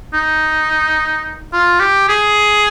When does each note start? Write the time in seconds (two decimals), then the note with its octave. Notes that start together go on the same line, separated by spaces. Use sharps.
0.14 D#4
1.53 F4
1.80 G4
2.09 G#4